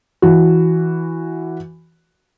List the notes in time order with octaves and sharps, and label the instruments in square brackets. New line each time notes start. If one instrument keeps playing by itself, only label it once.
[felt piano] E3 F#4